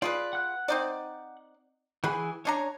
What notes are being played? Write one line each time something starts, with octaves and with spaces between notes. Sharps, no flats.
F4 G#4 B4 D5
F#5 F#6
C4 D#4 D5
E3 G#4 F#5 G#5 B5
C#4 D4 C#5 A#5